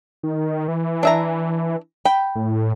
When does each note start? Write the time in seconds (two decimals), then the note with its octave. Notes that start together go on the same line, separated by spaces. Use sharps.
0.23 D#3
0.68 E3
1.03 D4 E5 A#5
2.05 G5 B5
2.35 A2